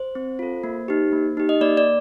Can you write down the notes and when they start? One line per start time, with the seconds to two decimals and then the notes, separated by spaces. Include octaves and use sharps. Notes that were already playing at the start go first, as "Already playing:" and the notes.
Already playing: C5
0.15 C4
0.39 F4 A4
0.63 A#3
0.88 D#4 G4
1.12 A#3
1.37 D#4 G4
1.49 D#5
1.61 A#3 D5
1.77 D5